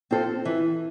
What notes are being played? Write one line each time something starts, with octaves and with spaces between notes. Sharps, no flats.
C4 F4 A4 C5
E3